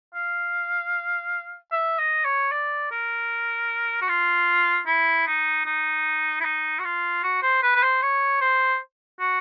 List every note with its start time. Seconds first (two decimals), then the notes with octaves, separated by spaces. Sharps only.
0.15 F5
1.72 E5
1.99 D#5
2.25 C#5
2.52 D5
2.91 A#4
4.01 F#4
4.08 F4
4.87 E4
5.27 D#4
5.65 D#4
6.40 E4
6.45 D#4
6.79 F#4
6.84 F4
7.23 F#4
7.42 C5
7.63 B4
7.76 B4
7.83 C5
8.02 C#5
8.41 C5
9.20 F#4